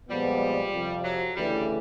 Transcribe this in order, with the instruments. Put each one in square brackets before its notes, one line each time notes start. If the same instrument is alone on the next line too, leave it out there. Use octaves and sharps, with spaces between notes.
[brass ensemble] A#2 F3 G#3 B3 [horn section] G3
[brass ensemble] F2 C3 F3
[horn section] F#3
[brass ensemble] D2 C#3 E3 A3 [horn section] G3